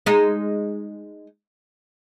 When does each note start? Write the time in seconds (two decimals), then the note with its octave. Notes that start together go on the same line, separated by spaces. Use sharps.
0.06 G#3 D#4